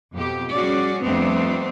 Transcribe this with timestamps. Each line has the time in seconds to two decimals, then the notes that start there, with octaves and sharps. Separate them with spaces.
0.13 F2 B2 G4
0.54 G3 C#4 F#4 G#4 D5
1.04 F2 G3 A3 B3 C4 D4